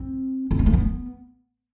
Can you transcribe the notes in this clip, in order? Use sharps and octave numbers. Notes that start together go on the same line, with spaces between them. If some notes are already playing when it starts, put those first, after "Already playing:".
Already playing: C4
C4
B3
A3
B3